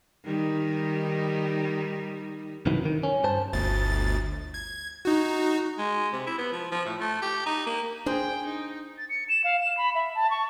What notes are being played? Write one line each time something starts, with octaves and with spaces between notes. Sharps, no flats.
D#3 G3 D#4
C2 F#2 D#3 E3 F#3
D#3
C#4
G2 C5 A5
G1 D2 A6
G#6
D#4 F#4
G#3
C3
E4
B3
F3
F3
A2
A3
G4
D#4
A#3
D4 G#4 C5 G5 G#5
D#4
A6
C#7
E7
F5
E7
B5
E5
A5
C#6